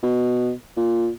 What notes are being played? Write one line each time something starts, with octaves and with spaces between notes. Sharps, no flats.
B2
A#2